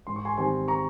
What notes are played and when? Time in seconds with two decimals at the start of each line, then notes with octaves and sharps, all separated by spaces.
0.07 G#2 C6
0.16 C#6
0.25 G#5 C6
0.38 D#3 G3 C4 G#5 C6
0.68 A#5 C#6